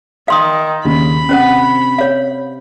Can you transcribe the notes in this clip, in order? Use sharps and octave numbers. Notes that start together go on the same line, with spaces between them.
D#3 F5 C6 D#6
D#2 C#3 B5
C3 C#4 C5 F#5
C#5 F5